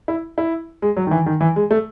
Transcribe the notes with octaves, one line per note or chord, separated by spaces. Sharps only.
E4
E4
G#3
F#3
D#3
E3
D#3
E3
G#3
A3